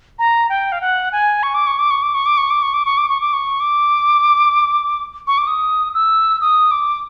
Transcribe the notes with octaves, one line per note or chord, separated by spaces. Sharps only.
A#5
G5
F5
F#5
G#5
C#6
D6
C#6
D6
C#6
D6
C#6
D6
C#6
D6
C#6
D6
C#6
D6
C#6
D6
C#6
D6
C#6
D6
D#6
E6
D#6
D6